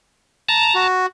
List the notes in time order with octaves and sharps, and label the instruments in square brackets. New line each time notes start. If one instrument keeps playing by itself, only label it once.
[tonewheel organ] A5 A#5
[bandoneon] F#4